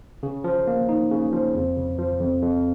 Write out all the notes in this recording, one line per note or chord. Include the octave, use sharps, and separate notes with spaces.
C#3
F3
A#3
D#4
C#3
F3
F2
C#3
F3
F2
F2